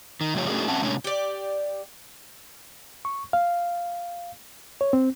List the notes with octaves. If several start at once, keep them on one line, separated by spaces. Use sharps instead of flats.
D#3
F#2 A2 C#3 F3 G4 C#5
A3 C#4 D4 F#4 G#4 A#4
C4 C#4 E5 F#5 A5
A2 C3 G#3 C#4 D4 C#5
G4 D5
C#6
F5
C#5
C4